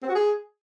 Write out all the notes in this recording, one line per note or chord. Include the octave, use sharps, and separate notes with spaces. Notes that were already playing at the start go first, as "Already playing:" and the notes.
C4
F#4
G#4